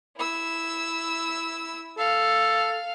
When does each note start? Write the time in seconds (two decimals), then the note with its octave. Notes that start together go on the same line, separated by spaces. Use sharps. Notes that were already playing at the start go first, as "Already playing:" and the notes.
0.17 E4 E6
1.98 A4 F5